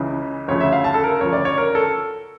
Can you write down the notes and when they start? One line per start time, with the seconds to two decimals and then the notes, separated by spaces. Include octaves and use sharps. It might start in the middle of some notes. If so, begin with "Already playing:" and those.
Already playing: C#2 C#3 E3
0.48 D2 C#3 F3 C#5
0.60 E5
0.72 F5
0.84 A5
0.94 A4
1.04 A#4
1.21 D2 C#3 F3 C#5
1.33 D5
1.45 C#5
1.58 A#4
1.75 A4